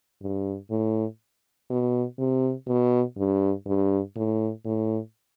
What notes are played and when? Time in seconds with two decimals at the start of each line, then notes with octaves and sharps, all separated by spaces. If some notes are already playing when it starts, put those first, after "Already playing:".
0.22 G2
0.71 A2
1.70 B2
2.18 C3
2.68 B2
3.18 G2
3.66 G2
4.16 A2
4.65 A2